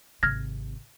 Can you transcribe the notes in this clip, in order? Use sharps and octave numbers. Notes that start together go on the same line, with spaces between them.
G#1 C3 F6 G#6 A#6